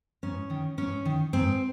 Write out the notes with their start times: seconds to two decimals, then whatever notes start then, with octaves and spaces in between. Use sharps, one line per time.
0.23 G#2 C#4
0.50 D#3
0.77 G#2 C#4
1.05 D#3
1.33 G#2 C4